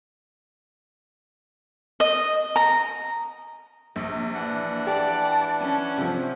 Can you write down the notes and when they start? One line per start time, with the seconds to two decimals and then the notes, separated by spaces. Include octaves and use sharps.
2.00 D#5
2.56 A#5
3.96 A#1 C3
4.35 E3 D4 F#5
4.87 G4 D5 A5
5.60 C#4
5.98 C3 F3